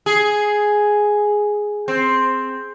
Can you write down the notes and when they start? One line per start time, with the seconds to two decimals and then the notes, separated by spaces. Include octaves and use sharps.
0.06 G#4
1.88 C4